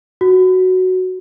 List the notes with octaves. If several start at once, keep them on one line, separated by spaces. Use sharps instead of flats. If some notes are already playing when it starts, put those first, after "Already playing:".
F#4